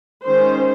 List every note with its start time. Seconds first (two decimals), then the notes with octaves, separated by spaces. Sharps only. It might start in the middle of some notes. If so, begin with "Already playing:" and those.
0.24 D#3 G#3 C#4 C5